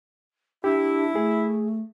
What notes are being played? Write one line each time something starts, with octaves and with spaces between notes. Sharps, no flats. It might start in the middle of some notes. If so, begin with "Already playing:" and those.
D4 E4 G4
A3 G#4